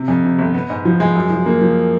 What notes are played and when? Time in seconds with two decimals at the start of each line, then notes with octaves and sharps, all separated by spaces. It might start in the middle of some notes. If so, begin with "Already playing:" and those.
Already playing: C3
0.08 F2
0.24 C3
0.39 G1
0.54 B3
0.70 G#2
0.85 F3
1.00 G#3
1.15 F#2
1.30 F3
1.46 A#3
1.61 F3